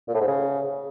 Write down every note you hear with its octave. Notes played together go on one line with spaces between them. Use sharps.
A#2
A2
G#2
C#3